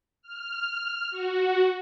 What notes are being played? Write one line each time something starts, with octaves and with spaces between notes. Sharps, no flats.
F6
F#4